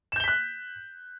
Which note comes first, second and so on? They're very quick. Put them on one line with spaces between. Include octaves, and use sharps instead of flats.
E7 G6 G7 B6 F#6